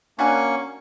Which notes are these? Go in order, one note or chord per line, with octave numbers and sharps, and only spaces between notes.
A#3 C#4 D4 F#4 G#5 C#6